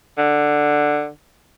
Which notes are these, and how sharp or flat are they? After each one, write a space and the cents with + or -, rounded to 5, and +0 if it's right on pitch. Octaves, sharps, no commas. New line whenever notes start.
D3 +10